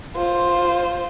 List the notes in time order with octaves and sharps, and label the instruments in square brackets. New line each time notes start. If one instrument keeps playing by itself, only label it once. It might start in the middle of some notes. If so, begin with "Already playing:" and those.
[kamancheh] F4 C5